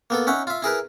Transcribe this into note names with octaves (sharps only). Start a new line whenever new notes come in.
A#3 B3 A4
C#4 D#4 E5 F#5
F4 E5
E4 G#4 A#4 B4